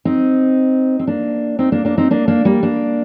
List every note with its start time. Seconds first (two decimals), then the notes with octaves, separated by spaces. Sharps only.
0.05 C4 D#4
0.99 C4
1.07 A#3 D4
1.59 C4 D#4
1.72 A#3 D4
1.85 A#3 D4
1.98 C4 D#4
2.11 A#3 D4
2.28 A#3 D4
2.45 G3 A#3
2.63 A#3 D4